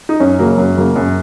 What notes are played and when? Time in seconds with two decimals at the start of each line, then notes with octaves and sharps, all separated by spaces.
0.09 D#4
0.20 F#2 C#4
0.39 C#3 F#3 A#3
0.58 F#2
0.76 C#3 F#3 A#3
0.96 F#2